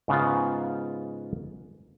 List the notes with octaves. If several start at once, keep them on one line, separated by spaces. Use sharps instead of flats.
G#2 C#3 B3 F4